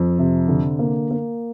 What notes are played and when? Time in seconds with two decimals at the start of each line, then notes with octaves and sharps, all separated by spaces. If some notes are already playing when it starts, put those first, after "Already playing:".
Already playing: F2
0.19 C3
0.48 D3
0.79 A#3
1.11 A#3